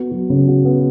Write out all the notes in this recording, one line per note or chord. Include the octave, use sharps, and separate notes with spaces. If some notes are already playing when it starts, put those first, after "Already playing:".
Already playing: B3 F#4
F#3
C#3
F#4
B3